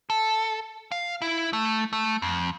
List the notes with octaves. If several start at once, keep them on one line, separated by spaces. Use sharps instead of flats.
A4
F5
E4
A3
A3
F2